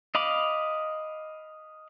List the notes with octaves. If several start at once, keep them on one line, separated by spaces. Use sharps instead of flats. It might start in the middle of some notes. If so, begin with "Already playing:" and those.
D#5 F5 B5 D6